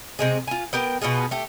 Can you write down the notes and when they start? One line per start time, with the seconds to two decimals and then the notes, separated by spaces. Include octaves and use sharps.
0.19 C3 G#3 G#4
0.47 F4 G#5
0.73 B3 G4 A#4 G5
1.02 B2 B3 F4 G#4
1.31 A3 G4